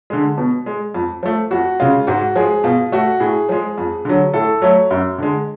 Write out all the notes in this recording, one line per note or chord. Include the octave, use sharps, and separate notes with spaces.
D3 G#3
B2
G#3
F2
F3 A3
F2 F#4
C#3 G#3 F4
G#2 F#4
F3 G#3 G#4
B2 F4
A3 F#4
A2 G#4
F3 G#3
F2
D3 F#3
A2 A4
F#3 A3 C#5
F#2
D3 G#3